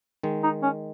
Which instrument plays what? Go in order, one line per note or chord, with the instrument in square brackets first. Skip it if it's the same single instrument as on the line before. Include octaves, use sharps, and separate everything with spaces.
[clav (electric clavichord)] D#3 G#3
[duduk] D#4
C#4